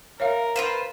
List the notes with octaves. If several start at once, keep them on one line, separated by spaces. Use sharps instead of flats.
A#4 C#5 E5 F5
F4 B4 C5 F5